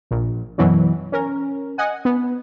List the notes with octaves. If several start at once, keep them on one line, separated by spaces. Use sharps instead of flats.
A#1
F#2 B2 E3 F#3
C#4 A#4
D#5 F#5 G#5
B3